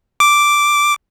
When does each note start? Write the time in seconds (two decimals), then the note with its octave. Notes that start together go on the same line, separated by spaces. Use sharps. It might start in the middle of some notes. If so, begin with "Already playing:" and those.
0.20 D6